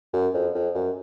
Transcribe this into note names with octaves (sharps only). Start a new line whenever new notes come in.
F#2
F2
F2
F#2